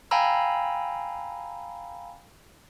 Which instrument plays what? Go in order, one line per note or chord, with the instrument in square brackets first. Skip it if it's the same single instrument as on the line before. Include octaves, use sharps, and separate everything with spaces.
[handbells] F5 G5 G#5 A#5 B5 E6